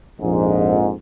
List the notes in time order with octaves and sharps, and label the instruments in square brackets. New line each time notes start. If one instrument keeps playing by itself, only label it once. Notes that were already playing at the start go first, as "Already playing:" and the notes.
[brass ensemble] A#1 F2 G#2